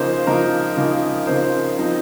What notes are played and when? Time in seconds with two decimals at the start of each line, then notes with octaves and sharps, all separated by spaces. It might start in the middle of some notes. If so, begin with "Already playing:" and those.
Already playing: C#3 F3 A#3 D#4 C5
0.27 C#3 F3 A#3 D#4 A#4
0.77 C#3 F3 A#3 D#4
1.27 C#3 F3 A#3 D#4 C5
1.78 F3 C4 D#4